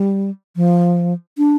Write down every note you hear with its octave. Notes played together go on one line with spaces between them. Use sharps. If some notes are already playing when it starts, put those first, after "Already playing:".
Already playing: G3
F3
D4